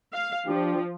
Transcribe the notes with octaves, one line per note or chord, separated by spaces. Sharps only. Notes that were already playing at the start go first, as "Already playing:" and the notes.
F5
F3 D4 G4